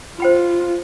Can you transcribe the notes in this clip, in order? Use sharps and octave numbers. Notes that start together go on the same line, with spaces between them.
F4 C5 G5 B5